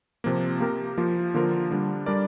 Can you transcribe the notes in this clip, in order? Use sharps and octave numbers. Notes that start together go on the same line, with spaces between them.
C3 F3 A#3
A#3 G4 A#4
F3 A#3 F4 C5
D3 F3 A#3 F4 A#4
D3 G3 D4
G3 D4 A#4 D5